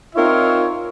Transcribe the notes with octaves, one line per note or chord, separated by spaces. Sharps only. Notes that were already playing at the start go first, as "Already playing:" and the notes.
C4 D#4 F4 A#4 C#5 E5